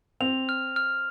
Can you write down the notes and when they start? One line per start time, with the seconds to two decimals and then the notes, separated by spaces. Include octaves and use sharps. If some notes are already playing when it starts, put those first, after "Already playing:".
0.21 C4 F7
0.49 F6
0.76 F6